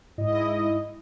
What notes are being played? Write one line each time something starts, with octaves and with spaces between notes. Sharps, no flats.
G#2 E4 D#5